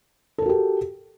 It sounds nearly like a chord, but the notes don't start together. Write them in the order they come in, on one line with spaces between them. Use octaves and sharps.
A4 A#4 F#4 G4